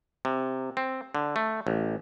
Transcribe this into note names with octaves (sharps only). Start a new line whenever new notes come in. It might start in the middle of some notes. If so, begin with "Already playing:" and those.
C3
C4
D3
A3
A1